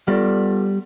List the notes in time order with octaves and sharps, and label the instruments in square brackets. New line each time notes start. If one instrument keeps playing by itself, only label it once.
[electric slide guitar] G3 [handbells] B3 F4 A4 D5